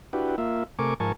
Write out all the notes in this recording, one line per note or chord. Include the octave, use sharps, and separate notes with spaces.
D4 E4 F#4 G4 B4
A#3 F4 E5
C3 A3 A#4 G#5 C#6 D6
G#2 F3 A#4 G#5 A5 C#6